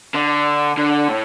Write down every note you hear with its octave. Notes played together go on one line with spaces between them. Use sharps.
D3
D3
A2